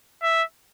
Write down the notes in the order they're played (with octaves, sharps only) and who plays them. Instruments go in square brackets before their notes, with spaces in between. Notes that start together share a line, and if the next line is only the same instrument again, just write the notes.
[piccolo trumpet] E5